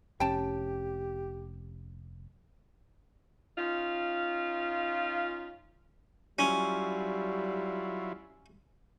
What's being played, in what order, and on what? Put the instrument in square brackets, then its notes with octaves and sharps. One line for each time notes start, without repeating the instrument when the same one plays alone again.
[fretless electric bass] F1 C#4 [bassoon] G4 [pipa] G5 A5
[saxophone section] C#4 D#4 F4
[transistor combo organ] F#3 E4 F4 [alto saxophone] G3 [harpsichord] C#4